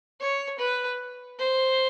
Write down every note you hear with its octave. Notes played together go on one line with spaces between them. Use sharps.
C#5
B4
C5